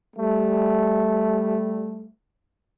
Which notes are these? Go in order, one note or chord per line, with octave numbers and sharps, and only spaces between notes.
G3 A3